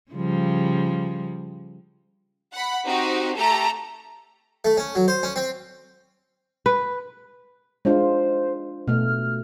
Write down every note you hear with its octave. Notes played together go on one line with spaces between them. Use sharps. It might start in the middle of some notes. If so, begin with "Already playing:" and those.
C#3 F3 G3
F#5 B5
C4 D#4 F#4 G4
A3 G4 A4 A#5
A3
C#4
F#3
C5
C#4
C4
B4
G#3 D4 F4 C5
B2 A3 F6